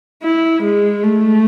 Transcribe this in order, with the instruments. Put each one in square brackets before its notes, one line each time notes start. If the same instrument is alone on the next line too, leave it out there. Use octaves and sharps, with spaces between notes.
[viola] E4
G#3
A3